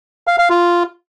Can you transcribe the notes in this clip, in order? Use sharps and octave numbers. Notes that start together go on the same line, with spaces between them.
F5
F5
F4